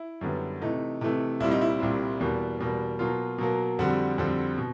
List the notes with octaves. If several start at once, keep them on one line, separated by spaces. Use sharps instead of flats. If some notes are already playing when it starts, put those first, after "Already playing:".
Already playing: E4
F#2 D3 G3 B3
C3 E3 A3 D#4
C3 E3 A3
C2 A#2 G3 C4 E4
D#4
E4
C2 A#2 G3 C4
E2 B2 G3 A#3
E2 B2 G3 A#3
B2 F#3 A#3 F4
B2 F#3 A#3
F2 D3 G3 C4 F#4
F2 D3 G3 C4
B2